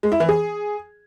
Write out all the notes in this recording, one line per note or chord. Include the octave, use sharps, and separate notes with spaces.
G#3
E4
E3
G#4